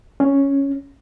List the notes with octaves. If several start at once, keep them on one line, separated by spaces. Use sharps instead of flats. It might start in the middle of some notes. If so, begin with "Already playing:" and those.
C#4